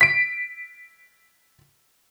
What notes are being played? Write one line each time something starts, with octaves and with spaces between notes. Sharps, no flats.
B6 D7